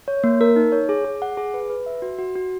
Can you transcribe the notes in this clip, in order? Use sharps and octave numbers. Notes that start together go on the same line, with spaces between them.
C#5
A#3
A#4
D#4
C#5
G#4
G#4
F#5
G#4
B4
B4
E5
F#4
F#4
F#4